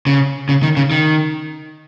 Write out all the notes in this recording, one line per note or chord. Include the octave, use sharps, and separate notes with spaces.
C#3
C#3
D#3
C#3
D#3